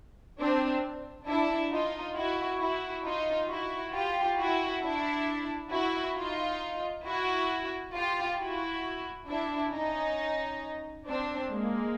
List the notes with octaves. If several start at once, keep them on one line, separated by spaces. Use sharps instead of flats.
C4 D4
D4 E4
D#4 F4
E4 F#4
E4 F#4
D#4 F4
E4 F#4
F4 G4
E4 F#4
D4 E4
E4 F#4
D#4 F4
E4 F#4
F4 G4
E4 F#4
D4 E4
C#4 D#4
C4 D4
G#3 A#3